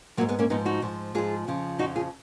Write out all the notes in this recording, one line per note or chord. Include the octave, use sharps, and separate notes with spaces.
F3 F#3 A#3
G#2
G#3 B3
A#3 C#4
G#2 F3 B3 D#4
D#4 F#4
G#2 F3
G#2 F3 F4 G#4
F2 C#3 F3
F2 C#3 F3 D#4 F#4
F4 G#4